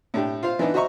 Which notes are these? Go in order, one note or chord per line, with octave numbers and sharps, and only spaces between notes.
A2 D4 G4
F4 C5 F5
E3 B3 D4 D#4
F#4 C5 D#5 E5 A#5 C#6